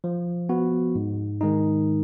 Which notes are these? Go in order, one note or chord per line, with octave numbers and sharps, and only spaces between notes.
F3
B3 F#4
G#2
D#3 G#3 D#4